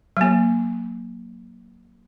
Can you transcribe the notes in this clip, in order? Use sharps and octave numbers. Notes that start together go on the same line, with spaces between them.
F#3 A#3